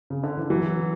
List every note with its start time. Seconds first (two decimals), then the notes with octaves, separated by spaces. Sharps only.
0.10 C#3
0.23 D3
0.37 E3
0.50 E3 F#3